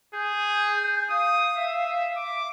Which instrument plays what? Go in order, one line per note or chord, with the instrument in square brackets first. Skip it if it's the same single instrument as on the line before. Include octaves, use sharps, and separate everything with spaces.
[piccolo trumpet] G#4 [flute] G6
[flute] F5 [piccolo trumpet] D#6
[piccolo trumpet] E5
D6